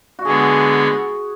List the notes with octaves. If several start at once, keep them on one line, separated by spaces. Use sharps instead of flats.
F#4
D3 G#3 B3 G#4